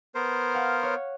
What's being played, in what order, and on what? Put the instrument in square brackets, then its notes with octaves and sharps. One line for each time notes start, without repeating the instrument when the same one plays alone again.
[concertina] B3 A#4 C5
[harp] F5 F#5 F6
C#5